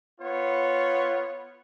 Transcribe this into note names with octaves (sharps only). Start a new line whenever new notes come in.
B3 F4 C#5